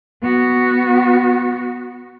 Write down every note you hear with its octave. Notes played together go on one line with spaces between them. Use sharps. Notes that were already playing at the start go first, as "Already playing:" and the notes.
B3 F#4